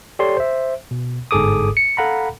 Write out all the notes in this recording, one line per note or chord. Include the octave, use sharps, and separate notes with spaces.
G4 A4 C#5 D5 C6
C5 E5
B2
G1 G#2 G#4 A4 D6 D#6
C#7
A4 F5 F#5 A#5 B5